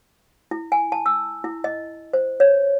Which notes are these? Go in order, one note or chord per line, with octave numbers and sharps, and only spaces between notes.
E4
G#5
A5
E6
E4
D#5
C5
C#5